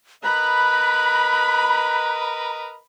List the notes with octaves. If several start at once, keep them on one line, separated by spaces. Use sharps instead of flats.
A#4 B4 D#5 B5 F#6